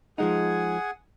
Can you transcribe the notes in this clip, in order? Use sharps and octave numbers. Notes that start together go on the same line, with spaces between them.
F3 G#3 D#4 G#4 F#5 G#5